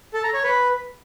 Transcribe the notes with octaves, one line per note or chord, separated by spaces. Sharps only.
A4
A#5
C#5
B4